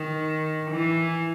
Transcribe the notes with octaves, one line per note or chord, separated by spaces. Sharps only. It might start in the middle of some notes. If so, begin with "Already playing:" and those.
Already playing: D#3
E3